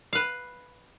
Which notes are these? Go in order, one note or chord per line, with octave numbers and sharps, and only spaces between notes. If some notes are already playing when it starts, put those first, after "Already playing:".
B4 F5